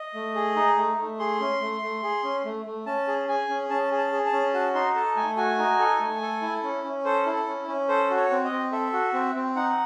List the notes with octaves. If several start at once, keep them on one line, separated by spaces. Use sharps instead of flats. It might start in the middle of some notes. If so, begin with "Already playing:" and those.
Already playing: D#5
A3
G#4
D#4
A3
A3
G#4 C6
C#4
A3
A3
G#4
C#4
A3
A3
C#4 A5
G#4
G#4 G#5
C#4
C#4 A5
G#4
A5
G#4
A5
C#4
F#4 A5
D#4 C6
A4 A5
A3 G#5
F#4 G#5
D#4
A4
A3
A4
E4
C#4
C#4
A4 C5
E4
A4
C#4
C#4
A4 C5
F#4
C#5
C4
D#5
C4
A4 E5
F#4
C4
C4
D#4 F#5